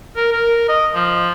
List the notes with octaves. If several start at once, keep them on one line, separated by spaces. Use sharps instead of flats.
A#4
A#4
D#5
F3